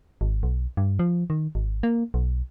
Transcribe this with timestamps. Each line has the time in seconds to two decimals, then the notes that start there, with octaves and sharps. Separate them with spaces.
0.21 G#1
0.43 B1
0.77 G2
0.99 F3
1.30 D#3
1.55 G#1
1.83 A#3
2.14 B1